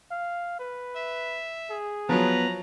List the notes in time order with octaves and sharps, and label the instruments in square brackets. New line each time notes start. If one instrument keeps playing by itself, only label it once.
[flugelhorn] F5
B4
[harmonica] E5
[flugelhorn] G#4
[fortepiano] F3 F#3 [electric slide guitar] B3 [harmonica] B4 A#5